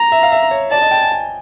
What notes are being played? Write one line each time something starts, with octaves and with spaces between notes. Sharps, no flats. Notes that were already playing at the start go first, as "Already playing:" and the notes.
Already playing: A#5
E5
F5
E5
C#5
D5 A5
D#5
G5
G#5
G#5